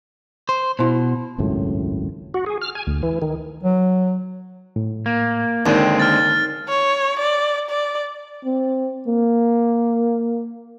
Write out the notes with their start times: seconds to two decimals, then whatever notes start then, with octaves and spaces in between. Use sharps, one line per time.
0.49 C5
0.79 B2 E4 C5
1.38 G#1 C#2 F#2 A2
2.34 F#4
2.46 G#4
2.61 F6
2.75 G#5
2.87 D2
3.03 E3
3.22 D#3
3.64 F#3
4.76 A2
5.06 A#3
5.66 D#2 D3 G#3 C4 D5 G5
6.00 A#3 F6 A6
6.68 C#5
7.19 D5
7.70 D5
8.45 C4
9.07 A#3